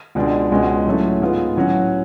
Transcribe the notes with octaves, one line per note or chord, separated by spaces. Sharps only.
C#2 B2 G#3 D4
C#2 B2 G#3 C#4 F#4
A2 F#3 A3 C#4
G#2 G#3 B3 F4
A2 F#3 C#4 F#4